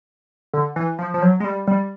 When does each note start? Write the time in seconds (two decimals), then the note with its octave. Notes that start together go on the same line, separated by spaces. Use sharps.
0.54 D3
0.76 E3
0.99 F3
1.14 F3
1.22 F#3
1.40 G#3
1.44 G3
1.67 G3